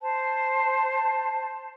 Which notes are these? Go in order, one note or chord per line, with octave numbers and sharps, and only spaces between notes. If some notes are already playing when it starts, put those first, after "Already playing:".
C5 A5